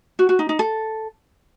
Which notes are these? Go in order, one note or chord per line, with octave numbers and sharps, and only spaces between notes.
F#4
F#4
D#4
D#4
A4